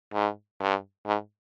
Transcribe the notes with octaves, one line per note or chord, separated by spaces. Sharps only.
G#2
G2
G#2